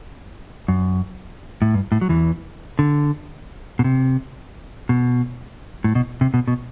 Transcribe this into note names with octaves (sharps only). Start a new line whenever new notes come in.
F#2
A2
G2
A2
F#3
E2 E3
D3
B2
C3
B2
A2
B2
C3
B2
B2